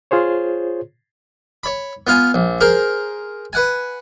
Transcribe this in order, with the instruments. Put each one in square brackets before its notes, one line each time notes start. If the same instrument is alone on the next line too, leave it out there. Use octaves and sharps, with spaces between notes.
[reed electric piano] F4 G#4 C5 C#5
[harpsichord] C#5 B5
B3 F4 F5 G#5
A#1
G#4 A#4 C5
B4 F#5 G#5